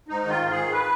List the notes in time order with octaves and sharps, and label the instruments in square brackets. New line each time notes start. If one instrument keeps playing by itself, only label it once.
[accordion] G#2 D#4
D#3
F4
G#2
G#4
D#3
B4